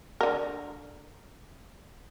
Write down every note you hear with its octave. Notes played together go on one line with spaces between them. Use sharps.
D3 A#4